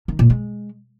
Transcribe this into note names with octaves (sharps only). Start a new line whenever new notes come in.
D#3
A#2
G#3